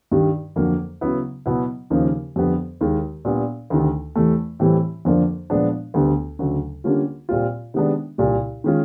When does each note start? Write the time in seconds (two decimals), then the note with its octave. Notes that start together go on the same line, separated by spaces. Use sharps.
0.12 G2 D#3 G3
0.56 F2 D3 F#3 A#3
1.01 C#3 F#3 B3 E4
1.46 B2 F#3 B3 E4
1.90 D#2 C#3 F3 A#3 D#4
2.36 F2 D3 G3 B3
2.81 D#2 D#3 G#3
3.25 A#2 G3 B3 D4
3.70 D2 C3 D#3
4.15 E2 C3 E3 A3
4.60 A2 E3 G3 C4
5.05 F2 D3 F3 A#3 D4
5.50 A#2 F3 G#3 B3 D4
5.94 D2 D3 G3 B3
6.39 D2 C#3 F#3
6.84 D3 G3 A#3 C#4 F4
7.29 A#2 G3 C4 F4
7.74 C3 D#3 G#3 B3 D4
8.18 C2 A#2 G3
8.64 D#3 G#3 C#4 F4